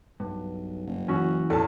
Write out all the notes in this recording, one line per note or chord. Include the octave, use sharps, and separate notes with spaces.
B1 G2
F#1
E3 C#4 F#4
E2 A2 A3 A5